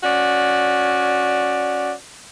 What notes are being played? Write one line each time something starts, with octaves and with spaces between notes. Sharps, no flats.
C#4 F#4 D5